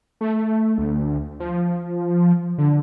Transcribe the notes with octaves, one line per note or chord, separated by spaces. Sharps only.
A3
D2
F3
D3